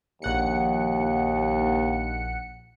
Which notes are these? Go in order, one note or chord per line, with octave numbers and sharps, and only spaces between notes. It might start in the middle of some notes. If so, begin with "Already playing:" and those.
A#1 D#2 F#5 C#7